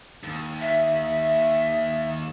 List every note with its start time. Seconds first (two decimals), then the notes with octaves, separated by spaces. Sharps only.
0.24 D#2
0.60 E5